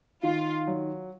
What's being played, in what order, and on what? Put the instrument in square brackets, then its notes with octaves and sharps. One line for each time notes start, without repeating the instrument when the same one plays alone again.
[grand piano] D#3 [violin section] F4
[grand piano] F#3